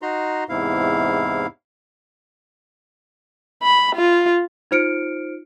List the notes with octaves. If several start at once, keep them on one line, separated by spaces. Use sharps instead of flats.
D#4 F#4 A#5 C6
E2 G#2 C3 E4 F5
B5
F4
D#4 F4 C5 F6 C#7 D7